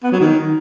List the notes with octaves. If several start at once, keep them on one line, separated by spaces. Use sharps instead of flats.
B3
F#3
D#3